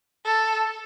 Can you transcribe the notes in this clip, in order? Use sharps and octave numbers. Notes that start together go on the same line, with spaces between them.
A4